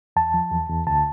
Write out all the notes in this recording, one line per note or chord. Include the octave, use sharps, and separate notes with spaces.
E2 A5
F3
E2
E2
D2 A5